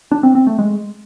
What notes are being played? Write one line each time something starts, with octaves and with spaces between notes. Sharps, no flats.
D4
C4
C4
A3
G#3